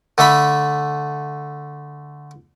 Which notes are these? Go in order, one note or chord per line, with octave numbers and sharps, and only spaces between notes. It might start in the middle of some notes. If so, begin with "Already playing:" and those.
D3 A3 E5 B5